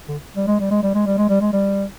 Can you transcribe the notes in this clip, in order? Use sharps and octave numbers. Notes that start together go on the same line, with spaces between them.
D3
G3
G#3
G3
G#3
G3
G#3
G3
G#3
G3
G#3
G3